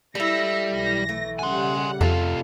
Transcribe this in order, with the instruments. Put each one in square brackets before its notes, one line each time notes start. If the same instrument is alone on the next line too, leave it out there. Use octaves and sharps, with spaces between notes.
[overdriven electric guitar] G3 [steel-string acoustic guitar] E4 A4 [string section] E6 A#6
[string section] B1 E3 A#6
[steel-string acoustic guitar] A3
[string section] C#3 G3 F#5 [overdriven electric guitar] G#5 C6
[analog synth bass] F2 [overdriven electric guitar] C3 F4 [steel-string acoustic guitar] A4